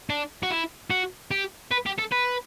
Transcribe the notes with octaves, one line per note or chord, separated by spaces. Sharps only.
D4
F#4
E4
F#4
G4
B4
G4
A4
B4